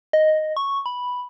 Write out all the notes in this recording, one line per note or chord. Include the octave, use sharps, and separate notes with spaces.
D#5
C#6
B5